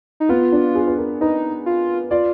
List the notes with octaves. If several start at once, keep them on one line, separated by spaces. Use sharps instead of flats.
D#4
B3 F4
D4
G#4
B4
A#4
D#4 B4
F4
F4 D5